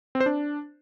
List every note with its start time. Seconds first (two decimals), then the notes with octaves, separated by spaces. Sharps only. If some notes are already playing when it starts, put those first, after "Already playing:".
0.15 C4
0.20 C5
0.26 D4